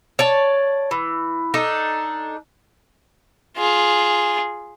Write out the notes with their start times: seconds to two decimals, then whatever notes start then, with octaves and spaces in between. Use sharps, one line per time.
0.19 C#5 D5 A5
0.91 E3
1.54 D4 D#4 A4
3.57 F4 G#4